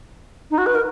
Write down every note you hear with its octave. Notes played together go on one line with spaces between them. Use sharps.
D#4
F#4
B4
A#4